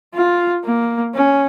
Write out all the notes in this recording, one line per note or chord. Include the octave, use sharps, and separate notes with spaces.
F4
A#3
C#4